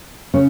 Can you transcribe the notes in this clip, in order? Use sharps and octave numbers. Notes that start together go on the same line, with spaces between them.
C#3 C#4